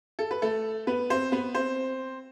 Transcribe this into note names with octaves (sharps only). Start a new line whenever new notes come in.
A4
B4
A3 A4
B3 B4
C4 C5
B3 B4
C4 C5